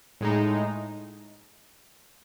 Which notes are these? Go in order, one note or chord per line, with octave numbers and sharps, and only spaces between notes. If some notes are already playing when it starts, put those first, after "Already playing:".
A2 G#3 D#4